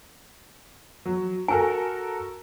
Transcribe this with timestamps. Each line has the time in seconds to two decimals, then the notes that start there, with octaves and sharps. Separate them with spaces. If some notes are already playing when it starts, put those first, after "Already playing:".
1.05 F#3
1.48 F#4 A4 A#4 G#5